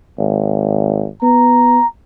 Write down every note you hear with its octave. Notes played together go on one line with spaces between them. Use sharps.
G#1
B3 A#5